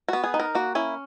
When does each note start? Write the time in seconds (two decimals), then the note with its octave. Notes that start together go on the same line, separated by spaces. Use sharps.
0.08 B3 F#4
0.24 G#4
0.34 D#4
0.40 A#4
0.55 A#3 F#4
0.75 C#4 E4